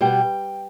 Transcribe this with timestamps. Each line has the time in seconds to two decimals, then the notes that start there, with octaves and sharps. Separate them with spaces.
0.01 B2 G3 B3 G5